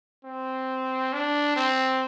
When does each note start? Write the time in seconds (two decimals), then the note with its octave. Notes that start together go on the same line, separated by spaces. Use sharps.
0.24 C4
1.13 D4
1.56 C4